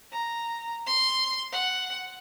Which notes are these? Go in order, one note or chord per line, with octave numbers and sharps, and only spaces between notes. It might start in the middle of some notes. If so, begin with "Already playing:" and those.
A#5
C6
F#5